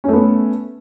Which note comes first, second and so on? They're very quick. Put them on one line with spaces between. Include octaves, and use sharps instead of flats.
C#4 A3 B3